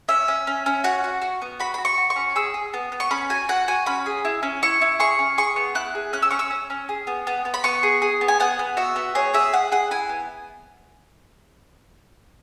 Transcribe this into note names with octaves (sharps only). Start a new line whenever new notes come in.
C#4 E5
C#4
C#4
C#4
F#4 F#5
F#4
F#4
B3
F#4 B5
F#4 B5
C#6
F#4
C#6
C#4
G#4 E6
G#4
B3
B3
C#6
C#4 B5
F#4 G#5
F#4 F#5
F#4 G#5
C#4 B5
G#4
E4
C#4
E4 C#6
E4
G#4 C#6
C#4
G#4 C#6
B3
E4 F#6
G#4
C#4 F#6
E6
C#4 C#6
E6
C#4
C#4
G#4
B3
B3
B3
B5
B3 C#6
G#4
G#4
B3
G#5
B3 F#5
B3
F#4 E5
B3
G#4 C#5
G#4 E5
G#4 F#5
G#4 F#5
E4 G#5
B3